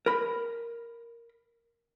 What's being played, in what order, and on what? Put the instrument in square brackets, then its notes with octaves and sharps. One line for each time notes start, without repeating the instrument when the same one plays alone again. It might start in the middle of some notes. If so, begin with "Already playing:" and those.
[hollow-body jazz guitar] A#4 B5